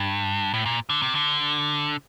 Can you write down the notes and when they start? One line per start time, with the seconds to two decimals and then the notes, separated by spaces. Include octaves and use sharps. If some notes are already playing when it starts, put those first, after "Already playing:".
Already playing: G2
0.54 A2
0.66 A#2
0.89 D3
1.02 C3
1.15 D3